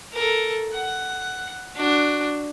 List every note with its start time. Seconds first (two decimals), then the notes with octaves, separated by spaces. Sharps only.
0.13 A4 A#4
0.73 F#5
1.75 D4 F#4